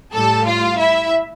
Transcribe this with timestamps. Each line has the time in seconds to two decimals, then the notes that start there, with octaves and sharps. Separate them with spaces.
0.13 A2 G3 A4 A5
0.46 F4 F5
0.79 E4 E5